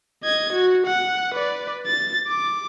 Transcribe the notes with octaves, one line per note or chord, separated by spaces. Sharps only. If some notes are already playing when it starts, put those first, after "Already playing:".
D#5 G#6
F#4
F#5
B4 D5
A6
D6